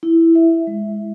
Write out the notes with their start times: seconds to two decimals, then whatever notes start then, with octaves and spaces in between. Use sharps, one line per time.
0.03 E4
0.35 E5
0.67 G#3